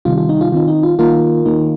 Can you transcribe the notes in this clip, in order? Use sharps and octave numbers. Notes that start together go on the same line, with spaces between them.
C3 D#3 G3 D#4 F4
F4
D#4
F4
D#3 C4 D#4 F4
D#4
F4
D#3 A#3 D#4 F4 A#4
D#3 A#3 D#4